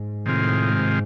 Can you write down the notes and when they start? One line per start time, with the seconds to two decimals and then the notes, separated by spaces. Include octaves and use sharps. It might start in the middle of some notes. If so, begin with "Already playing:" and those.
Already playing: G#2
0.26 A2 C3 D#3 G#3 C4 F4
0.71 G#2